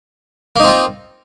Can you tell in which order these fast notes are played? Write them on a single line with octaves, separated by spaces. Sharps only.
A#3 D#4 C4 F4